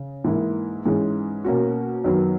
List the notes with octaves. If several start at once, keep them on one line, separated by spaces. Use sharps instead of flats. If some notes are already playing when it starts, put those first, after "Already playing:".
Already playing: C#3
G#2 E3 A#3 E4
G#2 E3 G#3 C#4 G#4
B2 A#3 C#4 F#4
F#2 D#3 F#3 B3